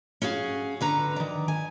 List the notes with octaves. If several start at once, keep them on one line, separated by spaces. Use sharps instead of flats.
C#4 F#4 G#4 F5
D3 B4 A#5
D#3 D5
G#5